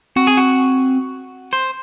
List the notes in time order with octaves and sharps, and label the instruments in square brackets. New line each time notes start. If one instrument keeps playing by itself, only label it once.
[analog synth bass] C4 [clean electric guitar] F#4
[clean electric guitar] G#4
F#4
C5